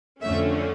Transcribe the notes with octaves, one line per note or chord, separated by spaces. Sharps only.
F2 D3 A3 C#4 E5